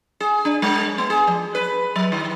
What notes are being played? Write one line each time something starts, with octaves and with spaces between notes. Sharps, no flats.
G#4
D4
G#3
B3
G#4
F3
B4
F#3
D#3